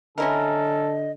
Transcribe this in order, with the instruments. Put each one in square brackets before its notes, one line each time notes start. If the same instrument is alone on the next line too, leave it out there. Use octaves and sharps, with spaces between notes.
[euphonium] D3 [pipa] C#4 E4 A#4 [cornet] A4 [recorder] D#5